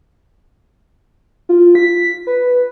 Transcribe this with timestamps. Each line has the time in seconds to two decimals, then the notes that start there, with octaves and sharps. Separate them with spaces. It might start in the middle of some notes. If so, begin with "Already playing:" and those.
1.49 F4
1.75 B6
2.27 B4